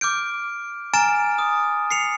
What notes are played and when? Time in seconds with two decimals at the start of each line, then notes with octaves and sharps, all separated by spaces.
0.01 D6 F6 G6 D7
0.93 G#5 A#5 F6 A6 D7 E7
1.38 D#6
1.91 C7 C#7 F7